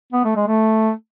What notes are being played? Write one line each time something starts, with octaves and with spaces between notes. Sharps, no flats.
B3
A3
G#3
A3